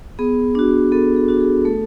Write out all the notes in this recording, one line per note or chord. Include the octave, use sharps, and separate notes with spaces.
B3 G#4
D4 F#4
B3 A4
G#4
D4 F#4
G#4
A3 A4